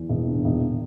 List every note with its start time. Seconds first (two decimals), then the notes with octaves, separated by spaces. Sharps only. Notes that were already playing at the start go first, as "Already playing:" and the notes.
Already playing: E2
0.09 E1
0.27 D3
0.45 E1